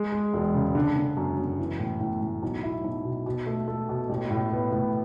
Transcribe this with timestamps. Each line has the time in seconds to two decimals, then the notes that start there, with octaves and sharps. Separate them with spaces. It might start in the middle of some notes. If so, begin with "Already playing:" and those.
Already playing: G#3
0.12 G#3
0.33 E1
0.54 C#3
0.75 D3
0.96 D3
1.17 F#2
1.38 F#2
1.58 E3
1.80 A2
2.00 A2
2.22 A2
2.43 B1
2.63 E4
2.84 B1
3.05 B2
3.26 B2
3.47 A3
3.68 A3
3.89 B2
4.09 A1
4.31 A2
4.51 B3
4.72 A2